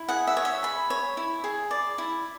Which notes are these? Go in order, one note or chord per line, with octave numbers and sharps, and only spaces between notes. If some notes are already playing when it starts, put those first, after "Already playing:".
Already playing: E4
G#4 F#5
E5
C#5
E5
G#4 B5
C#5
E4
G#4
D5
E4